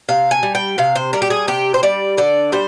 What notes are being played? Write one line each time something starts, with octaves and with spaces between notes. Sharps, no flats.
C3 F5
G#5
G3
G5
C3 F5
C5
G3 A#4
G4
G#4
C3 G4
C5
G3 D5
D3 D5
G3 C5